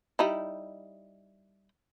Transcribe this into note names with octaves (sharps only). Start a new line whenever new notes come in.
G3 D#4 E4